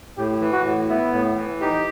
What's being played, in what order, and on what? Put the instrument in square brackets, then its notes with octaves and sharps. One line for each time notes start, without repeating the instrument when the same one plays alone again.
[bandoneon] A2 [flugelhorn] G4
[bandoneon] E3
[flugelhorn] F#4
[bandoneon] A2
[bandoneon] B3 [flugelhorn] E4
[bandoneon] A2
E3
[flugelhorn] D#4 [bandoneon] G4